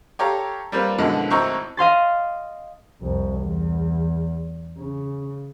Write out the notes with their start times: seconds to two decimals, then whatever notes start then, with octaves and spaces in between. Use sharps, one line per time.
0.19 G4 A4 C#5 F5 A#5
0.72 G3 A#3 C4 F4 B4
0.98 F#2 B2 D3 E3 F3 G#3
1.30 G#1 A2 C4 E5 A#5 C#6
1.77 D#5 F5 C6 A6
3.01 C2 F2
3.40 E2
4.78 C#3